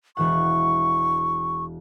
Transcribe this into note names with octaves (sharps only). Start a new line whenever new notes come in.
E1 E3 F#5 C#6